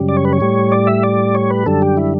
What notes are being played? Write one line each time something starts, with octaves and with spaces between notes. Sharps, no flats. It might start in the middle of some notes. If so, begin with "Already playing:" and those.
Already playing: F#2 C#3 G3
D5
C#5
B4
C#5
A2 G3
D5
E5
D5
C#5
B4
F#2 D3 G3 A4
G4
E4